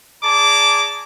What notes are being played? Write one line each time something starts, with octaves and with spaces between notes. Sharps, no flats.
G#4 D5 A5 A#5 D6